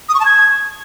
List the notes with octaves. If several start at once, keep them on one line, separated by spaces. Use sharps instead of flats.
D#6
C#6
A5
G#6